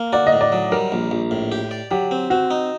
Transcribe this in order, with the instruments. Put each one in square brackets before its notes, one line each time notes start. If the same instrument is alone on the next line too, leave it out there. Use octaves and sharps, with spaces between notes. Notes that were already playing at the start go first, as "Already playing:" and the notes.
Already playing: [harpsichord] A#3
[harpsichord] F#4 [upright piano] D5
[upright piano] D#5
[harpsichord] A2
[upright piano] D5
[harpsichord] F#3
[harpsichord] G3 [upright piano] A#4
[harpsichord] A#1
A#1
A2
G4
D5
[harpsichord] F#3 [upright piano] G4
[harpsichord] C4
[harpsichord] C4 [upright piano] F#4
[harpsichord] D#4